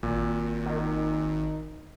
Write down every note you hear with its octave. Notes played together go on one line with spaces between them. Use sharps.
G#1 A#2
D#3